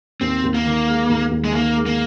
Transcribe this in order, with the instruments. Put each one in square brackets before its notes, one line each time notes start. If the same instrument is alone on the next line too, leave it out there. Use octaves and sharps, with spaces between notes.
[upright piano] D#2 [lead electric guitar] C4
[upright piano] D#2
[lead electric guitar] A#3
[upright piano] D#3
G#3
D#2
D#2
[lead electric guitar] G#3
[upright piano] D#3 [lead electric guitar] A#3
[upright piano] G#3
[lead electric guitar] A#3